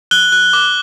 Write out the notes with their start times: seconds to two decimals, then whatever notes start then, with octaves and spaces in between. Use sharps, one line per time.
0.11 F#6 G7
0.32 F#6
0.53 D6